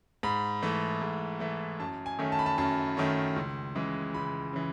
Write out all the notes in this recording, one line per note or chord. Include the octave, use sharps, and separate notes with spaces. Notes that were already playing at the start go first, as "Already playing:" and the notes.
G#2 B5
E3 A3
G#2
E3 A3
F#2 A5
G#5
D#3 A3 C#4
A5
B5
A5
F#2 A5
D#3 A3 C#4
C#2
C#3 E3 G#3
C#2 B5
C#3 E3